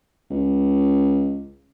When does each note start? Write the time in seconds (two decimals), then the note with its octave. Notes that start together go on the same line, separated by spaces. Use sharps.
0.30 C#2